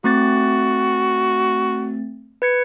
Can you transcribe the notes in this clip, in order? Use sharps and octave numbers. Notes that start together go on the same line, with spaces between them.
A3 C4 F#4 A6
B4 G#6 C#7